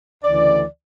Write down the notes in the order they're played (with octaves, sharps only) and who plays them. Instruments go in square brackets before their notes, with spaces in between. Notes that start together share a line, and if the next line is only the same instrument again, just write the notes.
[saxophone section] D2 C#3 E3 D5